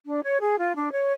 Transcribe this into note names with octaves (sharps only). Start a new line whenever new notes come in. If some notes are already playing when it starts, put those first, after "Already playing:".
D4
C#5
G#4
F4
D4
C#5